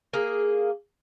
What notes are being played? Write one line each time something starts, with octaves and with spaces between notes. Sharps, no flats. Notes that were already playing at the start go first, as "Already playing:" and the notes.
A#3 G#4